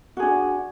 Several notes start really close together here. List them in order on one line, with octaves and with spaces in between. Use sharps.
F#4 G#4 D4